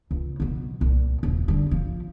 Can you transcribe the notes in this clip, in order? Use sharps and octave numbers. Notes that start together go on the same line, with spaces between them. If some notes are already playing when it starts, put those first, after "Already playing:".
C#2
B2 F#3
C2 A#2
D#1
D3 G3
C#3 F3